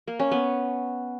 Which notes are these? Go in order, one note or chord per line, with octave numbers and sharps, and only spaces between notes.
A#3
C#4
B3